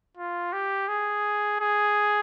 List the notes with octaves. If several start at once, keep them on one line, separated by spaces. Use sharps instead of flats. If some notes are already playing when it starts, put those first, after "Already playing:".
F4
G4
G#4
G#4